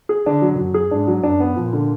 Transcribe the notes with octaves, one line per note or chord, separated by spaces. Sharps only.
G#4
D3 D4
F#3
F#2 F#3
G#4
G#2 D4
F#3
F#2 D4
B3
A#2 F3
D3